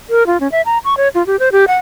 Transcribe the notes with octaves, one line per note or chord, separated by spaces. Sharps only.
A#4
F4
C#4
E5
A#5
C#6
C#5
F4
G4
C5
G4
F#5